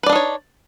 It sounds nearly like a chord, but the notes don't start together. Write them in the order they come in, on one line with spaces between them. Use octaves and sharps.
B4 D5 D4 D#4 C#5